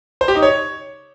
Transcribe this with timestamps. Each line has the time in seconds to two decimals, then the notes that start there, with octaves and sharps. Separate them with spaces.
0.21 C5
0.28 G4
0.35 D#4
0.42 C#5